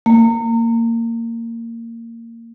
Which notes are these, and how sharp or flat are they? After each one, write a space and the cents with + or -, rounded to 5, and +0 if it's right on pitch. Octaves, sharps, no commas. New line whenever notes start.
A#3 -20